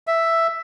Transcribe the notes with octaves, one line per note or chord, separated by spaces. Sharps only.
E5